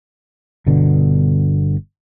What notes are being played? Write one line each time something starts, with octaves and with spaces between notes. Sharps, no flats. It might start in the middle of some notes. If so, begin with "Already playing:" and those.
G1 B2 D3